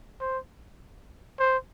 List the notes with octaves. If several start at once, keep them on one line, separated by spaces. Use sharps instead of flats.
C5
C5